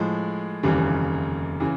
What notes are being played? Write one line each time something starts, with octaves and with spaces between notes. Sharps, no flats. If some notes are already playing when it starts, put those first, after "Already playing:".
Already playing: A2 F3 G#3
F1 D#2 C#3 E3 G3
C#3 E3